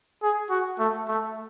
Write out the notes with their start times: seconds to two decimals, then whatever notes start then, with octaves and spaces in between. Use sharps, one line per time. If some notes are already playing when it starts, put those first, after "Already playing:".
0.23 G#4
0.50 F#4
0.79 A3
1.08 A3